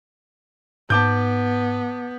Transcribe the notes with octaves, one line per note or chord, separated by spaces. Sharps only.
G#2 B3 A5 D6 G6